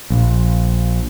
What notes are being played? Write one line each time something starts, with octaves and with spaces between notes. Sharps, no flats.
A#1